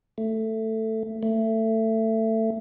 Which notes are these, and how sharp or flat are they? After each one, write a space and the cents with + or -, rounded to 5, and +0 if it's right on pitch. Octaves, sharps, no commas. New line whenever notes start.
A3 +10
A3 +20